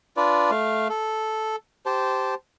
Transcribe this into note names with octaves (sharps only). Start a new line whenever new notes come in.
D4 F4 B4 D5
A3 F5
A4
G4 C5 A5